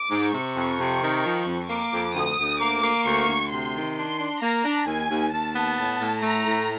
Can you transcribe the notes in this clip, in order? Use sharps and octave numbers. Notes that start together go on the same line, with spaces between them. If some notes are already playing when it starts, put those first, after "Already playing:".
Already playing: D6
G#2
C3 C#6
F2
C3
D#3
F3
F2
A#3 D6
F2
D2 D#6
D2
A#3 D6
A#3
D2 C#6
D2
C3 C6
D#3
D4 C6
D4
A#3 A#5
D4
D#2 G#5
D#2
D#2 A5
B3
A2
A2
A3 A#5
A2